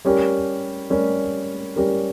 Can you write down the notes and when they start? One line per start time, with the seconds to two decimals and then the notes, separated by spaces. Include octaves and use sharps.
0.05 G3 C#4 G4 A#4
0.90 G3 C#4 G4 A#4
1.76 G3 C#4 G4 A#4